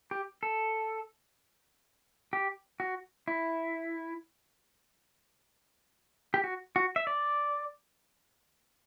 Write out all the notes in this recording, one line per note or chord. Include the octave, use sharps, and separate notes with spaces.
G4
A4
G4
F#4
E4
G4
F#4
F#4
E5
D5